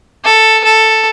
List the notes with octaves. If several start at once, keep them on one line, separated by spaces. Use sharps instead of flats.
A4
A4